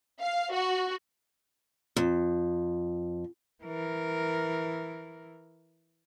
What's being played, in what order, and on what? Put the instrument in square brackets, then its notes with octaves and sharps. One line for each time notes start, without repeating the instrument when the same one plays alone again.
[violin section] F5
F#4
[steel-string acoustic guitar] F2
[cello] E3 A#4